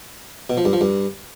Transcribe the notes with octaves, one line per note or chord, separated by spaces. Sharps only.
B2
F3
G2
F3
G2